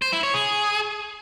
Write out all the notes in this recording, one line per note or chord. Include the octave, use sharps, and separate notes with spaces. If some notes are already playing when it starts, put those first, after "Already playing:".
C5
E4
C#5
G#4